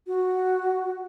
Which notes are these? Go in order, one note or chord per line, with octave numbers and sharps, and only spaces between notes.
F#4